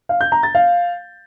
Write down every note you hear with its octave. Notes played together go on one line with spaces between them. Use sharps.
F5
G6
A#5
A6
F5